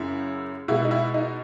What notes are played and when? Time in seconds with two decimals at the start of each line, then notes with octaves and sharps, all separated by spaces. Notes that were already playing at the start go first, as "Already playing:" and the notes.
Already playing: F#2 C#3 E4
0.68 B2 G#3 E4
0.85 D#4
0.91 E4
1.14 D#4